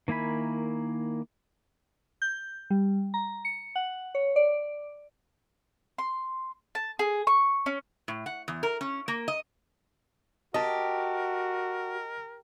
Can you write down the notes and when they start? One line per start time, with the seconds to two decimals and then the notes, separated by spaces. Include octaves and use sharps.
0.08 D#3 A#3 E4 G#5 B5
2.22 G6
2.70 G3
3.14 A#5
3.45 C#7
3.76 F#5
4.15 C#5
4.36 D5
5.98 C6
6.75 A5
6.99 G#4
7.27 C#6
7.66 C#4
8.08 A2
8.26 F#5
8.48 E2
8.63 A#4
8.81 C#4
9.08 A#3
9.28 D#5
10.54 F#4 G4 A#4 D#5 A5